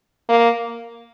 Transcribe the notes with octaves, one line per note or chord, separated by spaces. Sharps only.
A#3